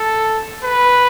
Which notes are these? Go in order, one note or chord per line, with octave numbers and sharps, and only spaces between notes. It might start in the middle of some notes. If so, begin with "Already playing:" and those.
Already playing: A4
B4